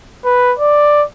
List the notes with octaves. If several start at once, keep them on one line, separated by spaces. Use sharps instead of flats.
B4
D5